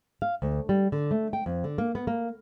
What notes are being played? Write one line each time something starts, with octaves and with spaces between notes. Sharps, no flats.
F5
D2
G3
D3
A3
G5
F2
D3
A#3
B3
A#3